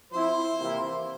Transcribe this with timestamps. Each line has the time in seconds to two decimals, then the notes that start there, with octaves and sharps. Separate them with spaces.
0.12 F3 C4 E4 C5
0.61 C3 E3 A#3 E4